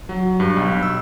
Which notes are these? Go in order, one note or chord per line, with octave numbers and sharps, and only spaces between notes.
F#3
G2
B1
E6